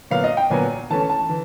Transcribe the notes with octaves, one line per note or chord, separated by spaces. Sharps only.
A#2 F#3 B3 F5
D#5
G5
A#2 F#3 B3 G#5
E3 A3 C#4 A5
A5
E3